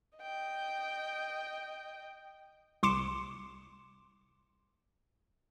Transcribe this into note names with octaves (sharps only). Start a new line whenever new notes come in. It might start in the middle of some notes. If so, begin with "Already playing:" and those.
D#5 G5
C2 C6 D6 C#7 E7